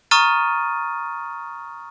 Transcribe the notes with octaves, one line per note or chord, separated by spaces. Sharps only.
A#5 C#6 D#6 F6 A6 D#7